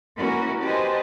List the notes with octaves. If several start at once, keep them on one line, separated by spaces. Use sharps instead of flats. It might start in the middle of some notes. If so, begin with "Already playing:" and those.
A#3 C#4 E4 F#4 A#4 B4
G4 B4 C5 D#5 G#5 A5